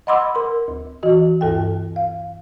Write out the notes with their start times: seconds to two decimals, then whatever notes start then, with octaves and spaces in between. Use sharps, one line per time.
0.07 D#5 F#5 B5 C6 D6 E6
0.35 A#4 C6
0.68 D2
1.03 E3 F#4 D#5
1.41 D2 G2 A4 G5
1.96 F5